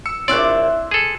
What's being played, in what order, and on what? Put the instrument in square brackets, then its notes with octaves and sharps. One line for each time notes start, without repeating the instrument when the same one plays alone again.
[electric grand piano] E6 C#7
[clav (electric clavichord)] A#1 D5 [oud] D4 E4 C#5 [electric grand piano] C6 E6 F#6
[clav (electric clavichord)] G#4 A4